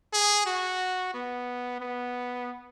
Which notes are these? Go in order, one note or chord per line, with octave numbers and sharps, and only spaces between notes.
G#4
F#4
B3
B3